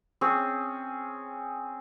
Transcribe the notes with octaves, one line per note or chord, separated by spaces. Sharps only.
C4 C#4 G#4